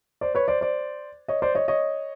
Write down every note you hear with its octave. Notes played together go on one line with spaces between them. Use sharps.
C5 D5
B4 C#5
C5 D5
C5 D5
C#5 D#5
C5 D5
C#5 D#5
C#5 D#5